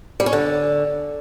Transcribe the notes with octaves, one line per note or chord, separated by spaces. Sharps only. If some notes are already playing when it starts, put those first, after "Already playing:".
G3
C#4
D3